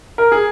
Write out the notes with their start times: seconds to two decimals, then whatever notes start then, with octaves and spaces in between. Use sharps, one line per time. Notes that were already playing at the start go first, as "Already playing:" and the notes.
0.18 A#4
0.32 G#4